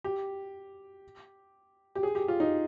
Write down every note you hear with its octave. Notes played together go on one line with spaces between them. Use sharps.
G4
G4
G#4
G4
F4
D#4